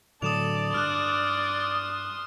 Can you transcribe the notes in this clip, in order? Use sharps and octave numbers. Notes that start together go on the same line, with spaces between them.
A2 D3 F#3 A4 D5 D#6 E7 F7
G2 C6 D#6 F6 F#6